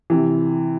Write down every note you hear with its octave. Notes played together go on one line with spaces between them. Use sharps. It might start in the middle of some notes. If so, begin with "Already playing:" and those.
C3 E3